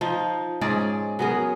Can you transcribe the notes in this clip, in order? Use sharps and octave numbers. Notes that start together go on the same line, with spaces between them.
F3 D#4
G#2 C#4 G#4 D5
F#3 B3 G#4 A#4